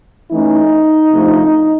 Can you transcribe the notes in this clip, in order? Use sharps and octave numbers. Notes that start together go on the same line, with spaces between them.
E3 A3 C#4 D#4
C3 F3 A3 D4